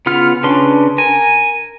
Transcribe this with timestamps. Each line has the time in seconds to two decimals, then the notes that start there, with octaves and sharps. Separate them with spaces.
0.06 C#3 B3 F4 F#5 F6
0.43 C#3 C#4 D4 B4 C6
0.98 A#4 G#5